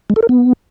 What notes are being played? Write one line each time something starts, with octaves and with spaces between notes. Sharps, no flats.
G#3
A4
A#4
B3